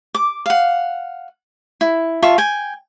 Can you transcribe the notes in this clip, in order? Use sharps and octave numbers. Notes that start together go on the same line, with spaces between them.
D6
F5 F#5
E4
F4 E5 A5 C#6
G5 G#5